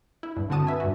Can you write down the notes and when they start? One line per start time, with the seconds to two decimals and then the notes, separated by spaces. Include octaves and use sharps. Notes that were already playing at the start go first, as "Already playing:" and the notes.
0.23 E4
0.37 G2
0.50 D3 C4 F#4 A5 D#6 D#7
0.67 B4 E5 G#5
0.80 G2 F#4